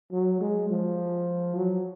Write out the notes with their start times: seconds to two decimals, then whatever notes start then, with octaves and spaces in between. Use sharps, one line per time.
0.11 F#3
0.41 G#3
0.70 F3
1.56 F#3